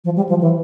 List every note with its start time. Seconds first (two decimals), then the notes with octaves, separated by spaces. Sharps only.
0.05 F3
0.16 G3
0.29 F3
0.41 E3